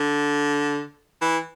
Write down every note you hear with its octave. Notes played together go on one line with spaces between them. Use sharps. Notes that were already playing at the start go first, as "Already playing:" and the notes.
Already playing: D3
E3